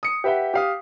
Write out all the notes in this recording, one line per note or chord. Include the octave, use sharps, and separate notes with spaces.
D#6 C#7
G4 B4 E5 F#5 G5
G4 F5 D#6